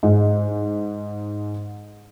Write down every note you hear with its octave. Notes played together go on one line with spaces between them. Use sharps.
G#2 G#3